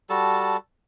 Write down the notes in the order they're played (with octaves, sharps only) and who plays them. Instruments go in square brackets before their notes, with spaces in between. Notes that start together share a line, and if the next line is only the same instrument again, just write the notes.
[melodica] G3 F#4 A4 A5